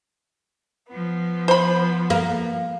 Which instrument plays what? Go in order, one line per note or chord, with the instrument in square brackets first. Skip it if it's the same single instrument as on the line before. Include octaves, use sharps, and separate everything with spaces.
[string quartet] F3 B3
[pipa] C5 B5
[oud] A#3